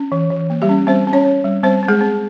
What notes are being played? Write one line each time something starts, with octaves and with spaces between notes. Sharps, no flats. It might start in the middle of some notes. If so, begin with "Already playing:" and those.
Already playing: C#4
E3
E3
A#3
G3 G4
C#4
G3 C4 C5
C4
C#4 C#5
C4
G3
G3 C4 C5
C4
G#3 G#4
C4